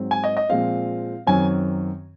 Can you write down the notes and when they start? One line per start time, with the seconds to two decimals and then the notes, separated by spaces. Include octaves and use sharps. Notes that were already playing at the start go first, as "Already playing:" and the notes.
Already playing: G#2 F#3 C4
0.11 G#5
0.24 D#5
0.37 D#5
0.49 A#2 F3 G#3 C4 F5
1.27 F#2 D#3 F#3 C4 G#5